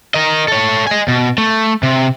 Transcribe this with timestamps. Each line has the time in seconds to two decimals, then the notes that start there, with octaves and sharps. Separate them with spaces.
0.14 A#4 D#5
0.48 A4 C#5
0.87 D#5 G#5
1.08 B2
1.38 A3
1.83 C3